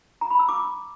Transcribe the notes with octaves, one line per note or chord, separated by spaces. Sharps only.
A#5
B5
E6
D6